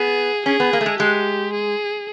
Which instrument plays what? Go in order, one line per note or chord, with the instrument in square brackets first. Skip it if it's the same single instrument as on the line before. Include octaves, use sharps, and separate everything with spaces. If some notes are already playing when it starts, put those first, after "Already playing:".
Already playing: [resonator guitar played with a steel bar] B3 [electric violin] G#4
[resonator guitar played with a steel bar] C#4 [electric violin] G#4
[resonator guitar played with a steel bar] B3
A#3
A3
G#3
[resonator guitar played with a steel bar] G#3 [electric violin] G4
[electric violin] G#4